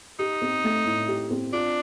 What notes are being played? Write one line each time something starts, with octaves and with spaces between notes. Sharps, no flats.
D#4 G4
C4
A3
A2
G4
C4
D4 F4